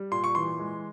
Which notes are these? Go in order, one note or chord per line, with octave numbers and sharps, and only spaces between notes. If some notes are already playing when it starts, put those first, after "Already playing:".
Already playing: G3
A#2 C6
C#6
E3 C6
G#3